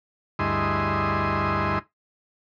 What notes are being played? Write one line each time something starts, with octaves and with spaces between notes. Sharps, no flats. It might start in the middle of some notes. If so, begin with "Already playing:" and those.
D2 G2 E4 G#4 D#5 C6